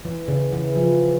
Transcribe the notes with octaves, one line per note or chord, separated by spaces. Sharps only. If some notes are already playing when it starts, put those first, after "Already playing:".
E3
C#3
E3
F3